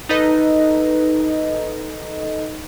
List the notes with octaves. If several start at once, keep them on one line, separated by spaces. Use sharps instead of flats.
D#4 A4 B4 D#5